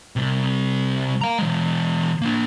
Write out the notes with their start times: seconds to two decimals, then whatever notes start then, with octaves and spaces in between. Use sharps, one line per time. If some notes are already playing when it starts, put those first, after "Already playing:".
0.16 C3 G3
1.21 F5 A#5
1.39 E3 G#3
2.22 A#3 D4